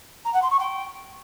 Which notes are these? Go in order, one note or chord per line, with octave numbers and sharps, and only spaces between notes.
A#5
F#5
C6
C#6
G5